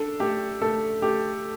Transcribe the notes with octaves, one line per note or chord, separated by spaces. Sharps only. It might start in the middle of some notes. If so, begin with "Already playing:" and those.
Already playing: D4 A4
A3 G4
A3 A4
A3 G4